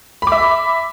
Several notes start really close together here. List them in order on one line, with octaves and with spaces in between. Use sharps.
B5 D6 E5